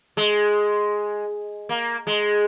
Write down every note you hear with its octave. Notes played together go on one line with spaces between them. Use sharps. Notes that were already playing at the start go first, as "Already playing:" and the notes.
G#3
A#3
G#3